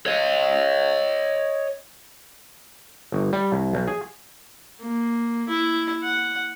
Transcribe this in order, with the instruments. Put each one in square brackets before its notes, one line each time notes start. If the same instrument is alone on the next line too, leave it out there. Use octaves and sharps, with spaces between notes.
[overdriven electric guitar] C#5 D#5
[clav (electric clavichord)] G1
G3
C2
B1
G#4
[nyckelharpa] A#3
E4
F#5